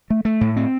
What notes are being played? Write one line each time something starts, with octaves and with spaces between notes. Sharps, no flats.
A3
A3
A2
C4